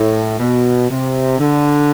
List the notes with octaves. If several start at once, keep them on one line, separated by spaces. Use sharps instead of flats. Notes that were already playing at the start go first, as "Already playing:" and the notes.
Already playing: A2
B2
C3
D3